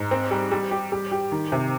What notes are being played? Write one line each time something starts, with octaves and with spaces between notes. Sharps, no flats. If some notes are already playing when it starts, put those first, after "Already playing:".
Already playing: G#2
C4
G3
G3
G4
G3
G4
D#3
C3